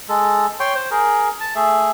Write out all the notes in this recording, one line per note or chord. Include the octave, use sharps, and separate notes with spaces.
G#3 A4
C#5 G5 C6
C5
G#4 A#4
A5
A3 G#4 E5